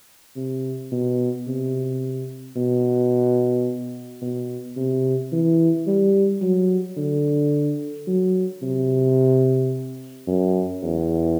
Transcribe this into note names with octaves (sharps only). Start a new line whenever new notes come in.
C3
B2
C3
B2
B2
C3
E3
G3
F#3
D3
F#3
C3
F#2
E2